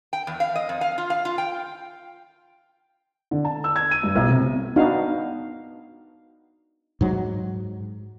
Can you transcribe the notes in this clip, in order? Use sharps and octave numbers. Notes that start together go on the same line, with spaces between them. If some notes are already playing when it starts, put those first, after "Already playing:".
G5
E2
F5
D#5
F2
F5
F4
F5
F4
G5
D3
A5
E6
G#6
D#7
G2
B1
C3
B3 D4 D#4 F#4 F5
G#2 F#3